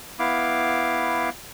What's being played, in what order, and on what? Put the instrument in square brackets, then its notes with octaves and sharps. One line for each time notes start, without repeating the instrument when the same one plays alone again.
[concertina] B3 E4 F5 D6